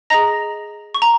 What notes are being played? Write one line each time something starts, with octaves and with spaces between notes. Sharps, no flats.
G#4 D#5 A#5 A#6
C#6
A#5